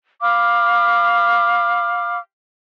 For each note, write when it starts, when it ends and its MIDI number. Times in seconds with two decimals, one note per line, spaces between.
0.21 2.17 77
0.21 2.17 83
0.21 2.17 86
0.21 2.17 89